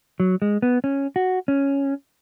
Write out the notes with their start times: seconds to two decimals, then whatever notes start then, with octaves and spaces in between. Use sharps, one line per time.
0.20 F#3
0.42 G#3
0.62 B3
0.84 C#4
1.16 F#4
1.48 C#4